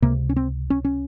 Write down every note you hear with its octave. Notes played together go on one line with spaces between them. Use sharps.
C#2 C3 A#3
C#4
C4
C#4
C#4